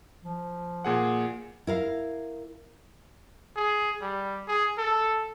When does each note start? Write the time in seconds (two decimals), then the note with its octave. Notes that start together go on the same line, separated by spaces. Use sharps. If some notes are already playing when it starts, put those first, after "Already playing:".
0.23 F3
0.85 A#2 G#4 F#5
1.67 E4 A#4 F5
3.56 G#4
4.01 G3
4.48 G#4
4.78 A4